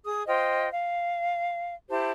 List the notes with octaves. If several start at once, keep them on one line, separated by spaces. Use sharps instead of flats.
G#4 D#6
F4 C5 D#5 G5
F5
E4 G4 C5 A5